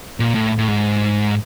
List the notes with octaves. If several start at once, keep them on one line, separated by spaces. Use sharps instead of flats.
A#2
A2
A2
G#2